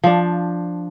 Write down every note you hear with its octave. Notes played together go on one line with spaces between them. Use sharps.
F3 D4